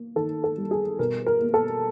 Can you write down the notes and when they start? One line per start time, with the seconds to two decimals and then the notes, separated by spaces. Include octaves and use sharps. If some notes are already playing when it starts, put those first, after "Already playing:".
Already playing: A#3
0.16 D#3 A4
0.44 A4
0.58 G3
0.71 G#4
0.99 B2 A#4
1.26 A#4
1.41 A#3
1.54 A4